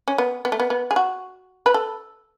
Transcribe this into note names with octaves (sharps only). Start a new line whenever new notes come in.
C#4
B3
B3
A3
B3
B3
G#4
F#4
B4
A4